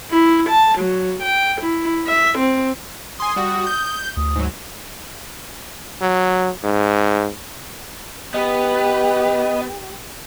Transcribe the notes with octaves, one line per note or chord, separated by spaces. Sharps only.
E4
A5
F#3
G5
E4
E5
C4
G#5 C6 D#6
G3 F#4
G6
D2 D#6
G#2 F#3
F#3
G#2
B3 G4 B4 D#5